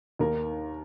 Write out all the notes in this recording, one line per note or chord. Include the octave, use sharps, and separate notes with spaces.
D#2 D#3 A#4